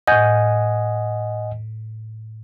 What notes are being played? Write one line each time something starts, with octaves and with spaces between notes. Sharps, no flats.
A2 D#5 F#5 G#5 G6